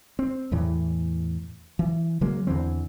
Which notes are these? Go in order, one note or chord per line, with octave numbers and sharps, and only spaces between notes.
C4
E2 A2 E3
E3
C#3 F#3 G#3 A#3
E2 D3 E3 C4